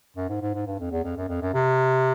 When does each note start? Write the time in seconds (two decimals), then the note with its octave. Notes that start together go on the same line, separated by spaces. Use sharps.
0.17 F#2
0.29 G#2
0.42 G#2
0.54 G#2
0.67 G2
0.79 F2
0.91 E2
1.04 F2
1.17 F#2
1.29 F2
1.42 F#2
1.54 C3